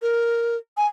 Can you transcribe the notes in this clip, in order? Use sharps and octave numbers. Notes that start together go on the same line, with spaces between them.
A#4
G#5